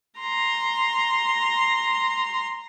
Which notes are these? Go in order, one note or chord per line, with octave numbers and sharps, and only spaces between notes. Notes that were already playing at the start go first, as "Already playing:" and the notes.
A#5 C6